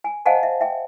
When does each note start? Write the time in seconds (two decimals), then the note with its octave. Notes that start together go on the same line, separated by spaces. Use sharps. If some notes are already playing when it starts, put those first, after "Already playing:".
0.04 G#5
0.26 C5 D#5 F5 F#5 G#5 A5
0.43 E5
0.61 E5 G5